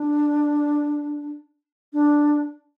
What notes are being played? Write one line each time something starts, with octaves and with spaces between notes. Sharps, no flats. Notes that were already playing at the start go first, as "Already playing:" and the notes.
Already playing: D4
D4